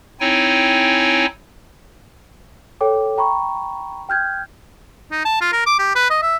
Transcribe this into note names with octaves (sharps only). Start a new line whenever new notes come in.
C4 D#4 E4 C#5 G5 G#5
A4 C#5 G5 D6
G5 A#5 B5 C#6
G5 F6 G6 G#6
D#4
A5
F4
A#4
D6
G4
B4
D#5
E5